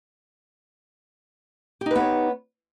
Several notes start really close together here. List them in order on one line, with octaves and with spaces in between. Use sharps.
G4 D#4 B4 B3 C#5